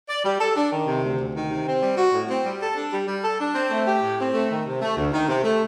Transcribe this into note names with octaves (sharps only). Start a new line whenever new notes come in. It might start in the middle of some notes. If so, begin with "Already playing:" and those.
D5
G3
A4
D4
D#3
C3
D2
D2
D#3
C3
C4
G3
F#4
A2
C4
G3
A4
D4
G3
G3
A4
D4
C4
A3
G4
A2
C4
A3
D#3
C3
A3
D2
D#3
C3
A3